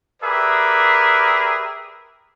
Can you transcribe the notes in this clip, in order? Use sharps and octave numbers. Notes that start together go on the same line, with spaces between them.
G4 G#4 A#4 B4 D5 E5